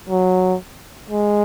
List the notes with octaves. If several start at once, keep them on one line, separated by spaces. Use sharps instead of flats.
F#3
G#3